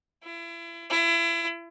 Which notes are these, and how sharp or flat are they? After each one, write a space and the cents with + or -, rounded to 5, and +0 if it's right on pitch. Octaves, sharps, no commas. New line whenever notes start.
E4 +35
E4 +35